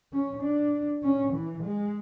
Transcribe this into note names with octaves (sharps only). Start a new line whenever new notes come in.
C#4
D4
C#4
E3
G#3